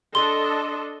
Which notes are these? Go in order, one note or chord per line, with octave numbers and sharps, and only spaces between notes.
D4 A4 D#5 C6 G7